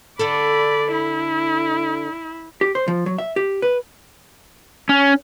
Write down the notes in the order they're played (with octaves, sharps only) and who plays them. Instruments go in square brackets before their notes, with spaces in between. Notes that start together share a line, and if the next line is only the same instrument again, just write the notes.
[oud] D3 A4 [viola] D5 B5
[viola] E4
[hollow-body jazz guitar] G4
C5
F3
F#3
E5
G4
B4
[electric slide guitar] C#4